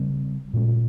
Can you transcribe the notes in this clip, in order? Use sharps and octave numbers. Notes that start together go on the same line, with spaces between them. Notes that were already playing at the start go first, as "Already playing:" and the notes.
Already playing: C#3 G3 C4
A#2 G#3 C#4